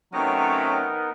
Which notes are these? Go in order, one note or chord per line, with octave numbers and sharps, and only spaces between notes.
C3 F#3 A3 B3 C#4 D#4 A#4 G5